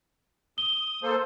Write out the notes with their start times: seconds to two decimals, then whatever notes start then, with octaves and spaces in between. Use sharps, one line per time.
0.58 D#6 G7
1.03 A#3 A4 C5